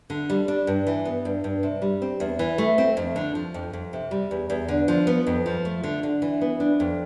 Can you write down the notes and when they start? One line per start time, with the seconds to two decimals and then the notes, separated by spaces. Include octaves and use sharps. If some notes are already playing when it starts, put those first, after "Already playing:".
0.10 D3
0.30 G3
0.48 D4
0.67 G2
0.87 E3
1.05 B3
1.25 G2
1.44 G2
1.63 C3
1.82 G3
2.02 C4
2.20 E2
2.39 E3
2.58 A3
2.78 C4
2.97 F2
3.16 D3
3.35 F3
3.54 F2
3.73 F2
3.93 C3
4.11 G3
4.31 E2
4.50 E2
4.68 D3
4.88 F3
5.07 B3
5.27 F2
5.46 F3
5.65 A3
5.84 D3
6.03 D3
6.22 E3
6.41 B3
6.60 D4
6.80 F2